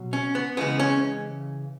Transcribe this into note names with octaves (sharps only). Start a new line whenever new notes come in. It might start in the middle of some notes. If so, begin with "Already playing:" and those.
Already playing: B2 F#3
C#4
B3
C#3 E3 G#3 B3
C#4